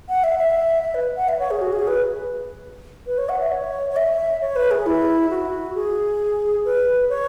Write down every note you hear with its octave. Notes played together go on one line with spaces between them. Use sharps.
F#5
E5
E5
E5
B4
F#5
E5
C#5
G#4
F#4
G#4
B4
B4
C#5
F#5
E5
C#5
C#5
E5
C#5
B4
G#4
E4
F#4
G#4
B4
C#5